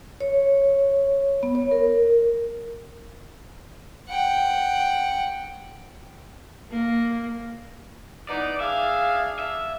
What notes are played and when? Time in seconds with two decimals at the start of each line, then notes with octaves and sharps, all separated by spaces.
0.21 C#5
1.43 B3
1.55 C#5
1.71 A#4
4.09 F#5 G5
6.71 A#3
8.29 E3 B3 D#4 D5
8.60 D4 G#4 E5 F5
9.39 E5